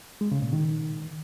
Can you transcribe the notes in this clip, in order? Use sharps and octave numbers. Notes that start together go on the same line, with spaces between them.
G#3
C#3
A#2
D#3